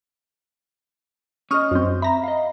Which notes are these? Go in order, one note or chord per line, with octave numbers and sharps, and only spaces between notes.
C#4 G#4 D#5 C#6 D#6 F6
F#2 C4
E5 A#5 B5
D#5 F5